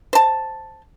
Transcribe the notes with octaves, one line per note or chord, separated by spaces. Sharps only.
C5 A5